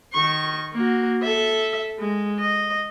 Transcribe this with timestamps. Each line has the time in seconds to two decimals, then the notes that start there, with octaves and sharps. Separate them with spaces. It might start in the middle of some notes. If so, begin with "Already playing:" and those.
0.13 D#3 C#6
0.73 A#3 F#4
1.23 A4 E5
1.99 G#3
2.40 D#5